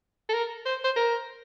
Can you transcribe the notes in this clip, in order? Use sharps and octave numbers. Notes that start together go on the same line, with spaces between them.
A4
A#4
C5
C5
A#4